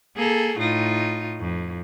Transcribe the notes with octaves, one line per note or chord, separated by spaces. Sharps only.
A#3 G#4 A4
A2 D#4 F4
F2